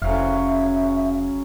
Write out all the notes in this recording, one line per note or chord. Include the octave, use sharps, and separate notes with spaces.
F1 C#3 F#3 E5 F5